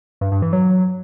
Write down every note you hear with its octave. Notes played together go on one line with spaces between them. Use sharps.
G2
G2
E3
F#3